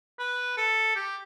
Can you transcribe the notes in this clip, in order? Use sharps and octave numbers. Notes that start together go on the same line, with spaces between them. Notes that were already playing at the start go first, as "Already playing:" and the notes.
B4
A4
G4